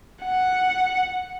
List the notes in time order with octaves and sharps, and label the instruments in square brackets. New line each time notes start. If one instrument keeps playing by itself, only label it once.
[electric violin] F#5